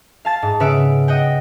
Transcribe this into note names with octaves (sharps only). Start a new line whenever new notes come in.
F5 A5 A6
G#2
C#3 B4 E5 F#5 F6 D7
D#5 F#5 G5